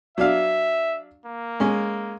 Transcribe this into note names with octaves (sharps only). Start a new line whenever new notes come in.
F#3 D4 E5 F5
A#3
G#3 C#4